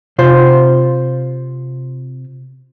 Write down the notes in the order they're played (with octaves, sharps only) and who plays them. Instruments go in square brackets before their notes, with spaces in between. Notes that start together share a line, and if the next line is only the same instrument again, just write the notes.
[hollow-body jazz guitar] C3 F4 C5